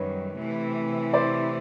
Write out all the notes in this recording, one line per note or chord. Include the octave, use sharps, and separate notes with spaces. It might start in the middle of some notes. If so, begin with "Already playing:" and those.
Already playing: F#2 D#3 G3 B4 C#5
C3 E3 A3
C5 D5